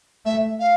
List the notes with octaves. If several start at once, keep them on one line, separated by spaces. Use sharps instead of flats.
A3 E5
F5